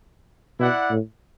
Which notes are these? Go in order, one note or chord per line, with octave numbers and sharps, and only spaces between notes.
B2 E4 D5 F#5
A2